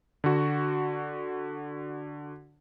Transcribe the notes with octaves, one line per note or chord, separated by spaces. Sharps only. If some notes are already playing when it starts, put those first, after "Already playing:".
D3 F#4